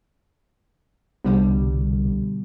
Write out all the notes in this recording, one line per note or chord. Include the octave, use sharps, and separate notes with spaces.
C2 B2 D3 G3